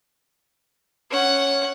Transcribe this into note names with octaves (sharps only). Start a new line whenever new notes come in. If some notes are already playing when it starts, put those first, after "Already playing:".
C#4 F#5